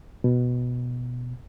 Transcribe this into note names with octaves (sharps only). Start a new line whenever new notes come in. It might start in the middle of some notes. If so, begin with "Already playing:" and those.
B2